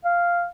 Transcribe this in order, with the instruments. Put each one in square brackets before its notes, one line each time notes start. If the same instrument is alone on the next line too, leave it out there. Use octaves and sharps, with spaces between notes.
[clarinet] F5